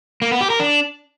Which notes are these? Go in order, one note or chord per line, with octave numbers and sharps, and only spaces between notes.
A#3
B3
G4
A#4
D4